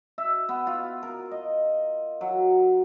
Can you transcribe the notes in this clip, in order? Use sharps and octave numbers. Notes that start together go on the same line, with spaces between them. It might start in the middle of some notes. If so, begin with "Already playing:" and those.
E5
B3
F4
A#4
D#5
F#3